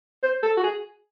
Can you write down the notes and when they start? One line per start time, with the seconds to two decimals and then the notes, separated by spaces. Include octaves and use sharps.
0.23 C5
0.43 A4
0.57 F#4
0.63 G#4